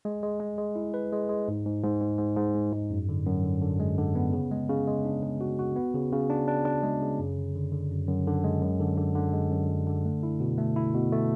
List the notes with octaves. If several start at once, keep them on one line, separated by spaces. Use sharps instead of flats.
G#3
G#3
G#3
G#3
E4
B4
G#3
G#3
G#2
G#2
G#2
G#2
G#2
G#2
G#3
G#2
F#2
D3
F#2
D3
D3
G#3
D3
B3
C#3
G#3
C#3
G#3
D4
C#3
F#4
F#4
B3
C#3
C#3
D4
D4
D4
G#3
C#3
F#2
D3
D3
D3
F#2
F#2
D3
G#3
F#2
D3
D3
D3
G#3
F#2
F#2
D3
A3
E4
B2
A3
E4
B2
A3